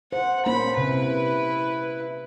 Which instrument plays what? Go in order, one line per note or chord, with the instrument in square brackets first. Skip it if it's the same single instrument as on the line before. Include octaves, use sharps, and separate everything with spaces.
[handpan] C5 [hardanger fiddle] F#5
[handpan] A#3 C#4 C5 [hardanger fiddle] B5
[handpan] C3 [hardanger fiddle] E4 B4